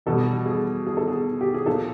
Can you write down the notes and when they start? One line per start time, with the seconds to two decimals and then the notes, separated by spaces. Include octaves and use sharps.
0.06 E2 B2 G3 A4
0.46 G#4
0.87 G#4
0.97 A4
1.08 G#4
1.41 G4
1.54 G#4
1.66 A#2 F3 A4